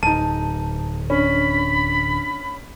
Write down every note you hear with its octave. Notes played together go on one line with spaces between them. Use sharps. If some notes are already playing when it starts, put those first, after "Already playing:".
D1 D#4 A5 D#7
C#4 D4 B5